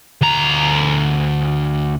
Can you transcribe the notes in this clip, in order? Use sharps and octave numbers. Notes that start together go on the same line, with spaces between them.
D2 A#5